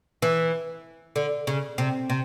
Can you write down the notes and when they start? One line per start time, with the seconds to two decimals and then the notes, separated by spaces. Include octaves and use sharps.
0.22 E3
1.16 D3
1.47 C#3
1.78 C3
2.10 C3